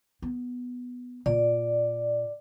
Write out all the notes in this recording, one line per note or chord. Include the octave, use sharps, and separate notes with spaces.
B3
A#2 D5